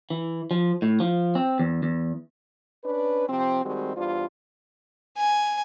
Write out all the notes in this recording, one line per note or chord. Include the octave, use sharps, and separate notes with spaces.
E3
F3
A2
F3
C4
E2
E2
C#4 D4 B4
C3 F3 C4
D#3 G3 G#3 C4 F#4
E2 G3 D4 F4 C5
G#5